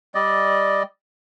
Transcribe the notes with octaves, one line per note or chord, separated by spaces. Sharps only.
G3 D5 D#5